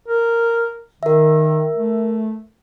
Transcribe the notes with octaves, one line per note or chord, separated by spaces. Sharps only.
A#4
D#3 A#4 E5
A3